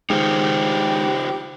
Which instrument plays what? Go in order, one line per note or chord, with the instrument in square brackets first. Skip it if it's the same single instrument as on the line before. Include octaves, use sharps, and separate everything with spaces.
[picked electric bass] D#3 G#3 [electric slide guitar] D#4 F4 C5 [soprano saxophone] G4